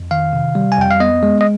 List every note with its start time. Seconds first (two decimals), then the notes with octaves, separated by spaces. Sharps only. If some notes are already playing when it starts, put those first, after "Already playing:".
Already playing: F2
0.11 D#3 F5
0.33 C3
0.55 G3
0.72 G#5
0.78 F2 G5
0.91 F5
1.00 B3 D#5
1.23 G#3
1.41 D#5